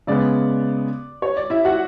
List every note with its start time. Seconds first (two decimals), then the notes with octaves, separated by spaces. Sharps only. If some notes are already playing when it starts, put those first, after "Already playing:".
0.07 C#3 G#3 B3 D5
1.22 C#5
1.37 D5
1.50 E4 E5
1.65 F#4 F#5